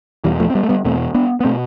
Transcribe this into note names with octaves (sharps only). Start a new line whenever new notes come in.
E2 B2 E3 G3
F3 A3
C4
G3 B3
A3
G3 B3
E2 B2 A3 C4
B3 D4
B3
B2 A3 C4